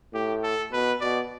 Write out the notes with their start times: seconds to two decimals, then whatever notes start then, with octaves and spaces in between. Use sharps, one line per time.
0.14 A2 G4
0.43 A4
0.72 B2 B4
1.01 B2 D5